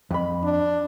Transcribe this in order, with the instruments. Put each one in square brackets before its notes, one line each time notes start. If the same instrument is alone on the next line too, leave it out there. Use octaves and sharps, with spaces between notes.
[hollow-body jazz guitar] F2 B5
[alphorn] D4